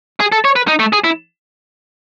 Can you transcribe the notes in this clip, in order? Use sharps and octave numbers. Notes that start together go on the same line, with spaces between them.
G#4
A4
C#5
B4
D#4
A3
G#4
E4